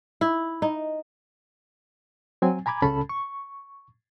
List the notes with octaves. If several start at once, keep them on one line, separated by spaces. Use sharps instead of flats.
E4
D#4
F#3 C4 G#5
G#5 A#5 B5 D6 G#6
C#2 C#3 C#4 A4 A5 B5
C#6